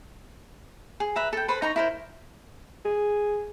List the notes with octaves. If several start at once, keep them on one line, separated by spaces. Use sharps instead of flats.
G#4
B4 E5 A#5
A4 G5
A4 B4 C5 B5
D#4 A#5 C#6
E4 A#4 C5
G#4